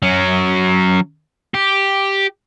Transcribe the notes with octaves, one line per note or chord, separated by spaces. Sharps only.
F#3 C#4
G4